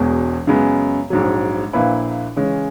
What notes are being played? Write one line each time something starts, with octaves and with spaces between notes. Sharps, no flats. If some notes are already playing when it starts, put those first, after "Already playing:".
Already playing: E1 E2 B2 G#3
F#2 C#3 G#3 B3
A#1 G#2 F#3
A#1 A#2 A#3 E4 B4
C#3 E3 G#3 C#4